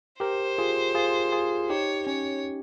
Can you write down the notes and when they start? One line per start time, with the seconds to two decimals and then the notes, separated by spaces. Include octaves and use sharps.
0.20 G4 A#4 C5
0.58 F4 G#4
0.95 F4 G#4
1.32 F4 G#4
1.70 D#4 G4 C#5
2.07 C#4 C#5